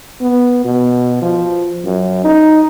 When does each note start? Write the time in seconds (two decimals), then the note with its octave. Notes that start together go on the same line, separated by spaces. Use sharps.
0.21 B3
0.65 B2
1.22 F3
1.85 F#2
2.25 D#4